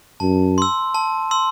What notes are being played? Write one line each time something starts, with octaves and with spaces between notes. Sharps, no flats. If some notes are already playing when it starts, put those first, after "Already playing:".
F#2 A5
C6 E6
A5
C6 E6